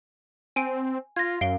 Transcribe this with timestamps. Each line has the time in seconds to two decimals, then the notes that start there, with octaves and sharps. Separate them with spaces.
0.56 C4 G#5 D7
1.16 F4 G#6 A#6
1.41 F#2 F5 D7 G7